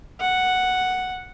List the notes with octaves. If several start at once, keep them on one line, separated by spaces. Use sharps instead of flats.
F#5